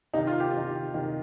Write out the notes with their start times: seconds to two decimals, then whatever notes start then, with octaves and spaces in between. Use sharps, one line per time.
0.13 C3 D#4
0.18 D#3
0.27 F4
0.40 G4
0.53 C3 D#3
0.94 C3 D#3